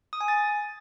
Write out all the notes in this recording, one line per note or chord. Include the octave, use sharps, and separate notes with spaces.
D#6
G#5
A6